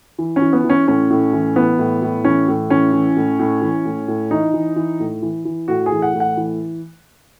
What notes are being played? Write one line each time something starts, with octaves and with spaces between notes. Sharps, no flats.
E3
C#4
E3
B3
E3
C#4
A2 C#4
A2
E3
E3 B3
A2
A2
E3 C#4
A2
E3 C#4
E3
A2
A2
E3
A2
A2
E3 D#4
E3
E3
A2
E3
E3
A2 F#4
G#4
E3
F#5
A2
F#5
E3